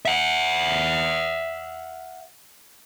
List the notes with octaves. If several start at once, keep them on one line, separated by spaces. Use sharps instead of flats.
E5 F#5